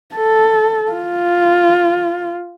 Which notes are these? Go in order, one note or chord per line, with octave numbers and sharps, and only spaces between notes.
A4
F4